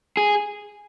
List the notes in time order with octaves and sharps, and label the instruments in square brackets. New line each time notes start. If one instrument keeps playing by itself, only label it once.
[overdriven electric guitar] G#4